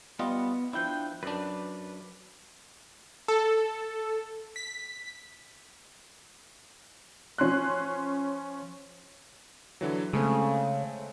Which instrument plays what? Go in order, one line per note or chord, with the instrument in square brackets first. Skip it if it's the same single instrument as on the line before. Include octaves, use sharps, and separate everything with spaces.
[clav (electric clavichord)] G3 F4 D#5 [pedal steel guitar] B3
[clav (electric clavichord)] F3 E4 [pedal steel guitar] D4 G5
[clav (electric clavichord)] F#2 D4 [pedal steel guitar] B4 D5
[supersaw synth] A4
B6
[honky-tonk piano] F3 C#4 C6 F#6
[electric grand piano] D3 E3 F#3
[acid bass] C#3 [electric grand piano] G#3 A3 C4